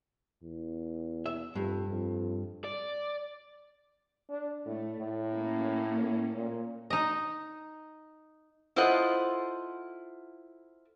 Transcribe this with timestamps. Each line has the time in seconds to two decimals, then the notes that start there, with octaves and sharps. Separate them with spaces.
0.43 E2
1.26 E5
1.55 F1 G2
1.88 F2
2.64 D5
4.29 D4
4.66 A2 A3
4.98 A2
5.29 A#3 C#4
6.02 A2
6.36 A#2
6.90 D#4 D#5
8.76 E4 F4 A4 C5 D#5 F#5